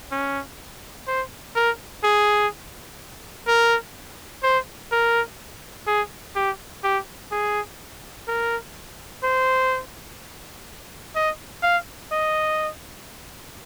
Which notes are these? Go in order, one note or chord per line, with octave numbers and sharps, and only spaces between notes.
C#4
C5
A#4
G#4
A#4
C5
A#4
G#4
G4
G4
G#4
A#4
C5
D#5
F5
D#5